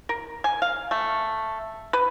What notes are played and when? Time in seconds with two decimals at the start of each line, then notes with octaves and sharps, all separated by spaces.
0.09 A#4
0.44 G#5
0.62 F5
0.91 A3
1.93 B4